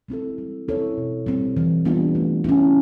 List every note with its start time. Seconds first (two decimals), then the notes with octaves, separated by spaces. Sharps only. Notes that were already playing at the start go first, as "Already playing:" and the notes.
0.08 G#3 C4 E4 A4
0.38 G3
0.68 C4 E4 A4 C#5
0.97 B2
1.26 G3 C4
1.57 E3
1.85 G3 B3 D4 F4
2.15 A3
2.44 C#4 E4